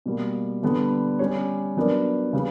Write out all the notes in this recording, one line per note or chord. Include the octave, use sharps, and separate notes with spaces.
B2 G3 A#3
D3 G3 B3
G3 C#4 G4 C#5
F#3 B3 D4 A#4 D5
C#3 G3 B3